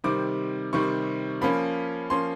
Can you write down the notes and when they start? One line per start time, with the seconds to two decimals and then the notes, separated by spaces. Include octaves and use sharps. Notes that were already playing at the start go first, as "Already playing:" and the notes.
0.04 C3 D#3 G3 C4 D6
0.73 C3 D#3 G3 C4 C#6
1.41 F3 A#3 C#4 B5
2.10 F3 A#3 C#4 C6